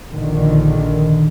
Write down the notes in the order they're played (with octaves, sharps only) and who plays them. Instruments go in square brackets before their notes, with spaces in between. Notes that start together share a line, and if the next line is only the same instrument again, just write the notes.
[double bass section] A#1 D3 D#3